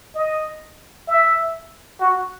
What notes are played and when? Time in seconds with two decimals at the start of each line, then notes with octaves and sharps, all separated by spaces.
0.15 D#5
1.08 E5
2.00 F#4